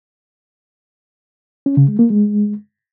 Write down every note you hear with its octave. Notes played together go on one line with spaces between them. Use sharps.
C#4
C#3
G#3
A#3
G#3